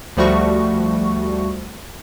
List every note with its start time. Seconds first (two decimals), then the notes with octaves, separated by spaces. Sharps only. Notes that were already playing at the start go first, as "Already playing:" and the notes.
0.17 D2 F3 G3 A3 F#4 C#6